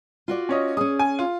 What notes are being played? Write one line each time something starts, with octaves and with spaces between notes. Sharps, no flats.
F4 F#4 D5
C#4 C#5 D#5
C#4 G#4 D#6
G#5
F4